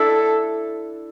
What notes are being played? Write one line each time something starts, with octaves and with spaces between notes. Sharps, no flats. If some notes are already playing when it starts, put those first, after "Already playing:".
Already playing: D4 E4 A4